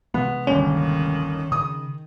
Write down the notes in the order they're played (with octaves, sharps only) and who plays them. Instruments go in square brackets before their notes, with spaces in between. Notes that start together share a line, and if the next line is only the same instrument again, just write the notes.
[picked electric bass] C3 E3 G#3 [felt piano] B3
[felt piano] G1 D#2 [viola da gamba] D#3 [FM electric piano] C#4
[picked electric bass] C#3 [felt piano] D#6